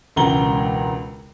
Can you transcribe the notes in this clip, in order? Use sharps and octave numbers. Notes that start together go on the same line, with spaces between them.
E1 C#2 A#5 G7